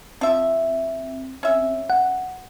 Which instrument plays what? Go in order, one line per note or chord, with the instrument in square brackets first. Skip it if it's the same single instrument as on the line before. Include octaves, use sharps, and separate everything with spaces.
[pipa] F3 E5 [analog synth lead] C4
[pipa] C#4 E5
[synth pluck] F#5